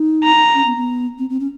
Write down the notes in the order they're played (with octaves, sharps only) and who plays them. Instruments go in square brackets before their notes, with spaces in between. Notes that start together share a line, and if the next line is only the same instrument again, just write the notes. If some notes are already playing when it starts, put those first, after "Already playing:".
Already playing: [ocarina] D#4
[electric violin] A#5
[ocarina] C#4
B3
B3
C4
C4
C#4